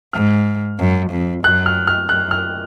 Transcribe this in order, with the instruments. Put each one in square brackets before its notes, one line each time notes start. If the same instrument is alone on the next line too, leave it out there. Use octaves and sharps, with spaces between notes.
[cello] G#2 [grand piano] F6
[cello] F#2
F2
[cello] F#2 [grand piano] F#6
[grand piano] F6
F6
[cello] F#2 [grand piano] F#6
[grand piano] F6